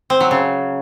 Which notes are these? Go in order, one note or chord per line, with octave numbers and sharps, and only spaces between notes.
C4
F#3
C#3